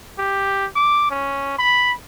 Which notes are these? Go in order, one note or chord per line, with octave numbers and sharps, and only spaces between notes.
G4
D6
C#4
B5